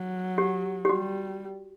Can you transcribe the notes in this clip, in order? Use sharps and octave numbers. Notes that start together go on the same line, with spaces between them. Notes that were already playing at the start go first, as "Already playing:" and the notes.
Already playing: F#3
G4
G4
G3 F#4